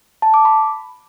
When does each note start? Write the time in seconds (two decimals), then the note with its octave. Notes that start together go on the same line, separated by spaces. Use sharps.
0.22 A5
0.34 D6
0.45 B5